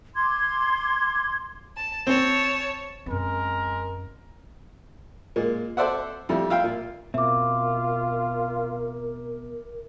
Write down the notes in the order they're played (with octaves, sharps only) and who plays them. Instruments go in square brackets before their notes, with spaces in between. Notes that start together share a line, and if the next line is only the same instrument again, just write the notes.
[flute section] C6 D6 G#6
[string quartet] A5
[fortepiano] C4 [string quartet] C#5 A5
[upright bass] F#2 C4 [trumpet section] G#3 A#4
[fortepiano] A#2 G#3 A#3
A4 C5 D5 E5 F#5
F2 G3 A3 E4
F4 E5 F5 G5
A#2
[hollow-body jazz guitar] B2 C4 [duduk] F4 [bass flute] A#4 [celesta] E5 D6